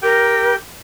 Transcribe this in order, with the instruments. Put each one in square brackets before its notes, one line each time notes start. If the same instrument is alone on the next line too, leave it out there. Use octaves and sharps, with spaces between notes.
[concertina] G4 G5 [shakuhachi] A#4